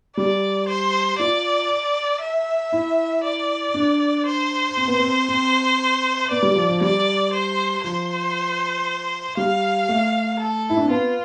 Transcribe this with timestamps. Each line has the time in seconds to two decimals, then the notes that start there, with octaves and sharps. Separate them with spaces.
0.16 G3 D5
0.68 C5
1.19 F4 D5
2.21 E5
2.72 E4
3.24 D5
3.74 D4
4.26 C5
4.77 C4
4.88 B3
5.00 C4
5.29 C4
6.30 B3 D5
6.43 G3
6.56 F3
6.69 F3
6.81 G3 D5
7.33 C5
7.84 F3 C5
9.37 G3 F5
9.89 A3
10.39 A4
10.70 E4
10.77 D4
10.84 C4
10.90 B3 F4